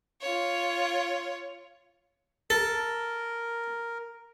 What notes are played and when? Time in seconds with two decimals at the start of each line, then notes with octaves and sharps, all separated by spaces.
0.21 F4 C#5
2.50 A4 A#4